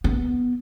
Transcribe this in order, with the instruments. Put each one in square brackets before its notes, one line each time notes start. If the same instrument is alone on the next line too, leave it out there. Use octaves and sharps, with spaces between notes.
[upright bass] B3